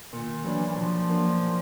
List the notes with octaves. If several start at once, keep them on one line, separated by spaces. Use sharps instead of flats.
A#2 D#3
E3 F#3 A#3 D4
E3
A#2 F3
F#3 A#3 D4
A#2